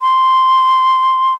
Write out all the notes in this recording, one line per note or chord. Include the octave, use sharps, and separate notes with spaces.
C6